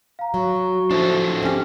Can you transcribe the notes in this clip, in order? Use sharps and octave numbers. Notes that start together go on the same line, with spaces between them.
F5 A#5
F#3 F#4
F3 D4 E4 A4 C5
C4 C#4 G4